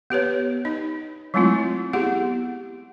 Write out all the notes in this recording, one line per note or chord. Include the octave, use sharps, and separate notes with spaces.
B3 G4 B4 C#5
D#4 D#5
F#3 G#3 A3 C4 E4 F4
B3 E4 G4 G#4 F#5